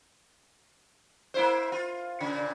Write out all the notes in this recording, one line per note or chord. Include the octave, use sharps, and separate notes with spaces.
A#3 E4 C5
F4
A#2 C#3